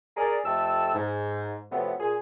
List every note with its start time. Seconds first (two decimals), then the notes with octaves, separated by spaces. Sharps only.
0.16 G#4 A#4 D5
0.44 F2 A3 G4 A5 E6
0.93 G#2
1.70 C3 F3 F#3 A3 B3
1.99 A#2 G#4